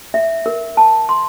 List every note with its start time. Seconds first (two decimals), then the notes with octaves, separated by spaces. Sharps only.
0.14 E5
0.46 A#4
0.77 A5
1.09 C6